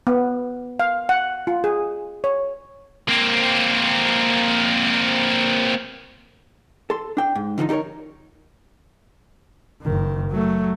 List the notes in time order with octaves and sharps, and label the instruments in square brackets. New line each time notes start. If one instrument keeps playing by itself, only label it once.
[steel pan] B3
F5
F#5
F4
G#4
C#5
[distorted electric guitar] A#3 C4
[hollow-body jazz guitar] A4 C6
D4 G5
G#2
D3 F3 A#3 D#4
D#4 G4 A4 A#4 C#5
[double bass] F#1 D#3
F#3 A3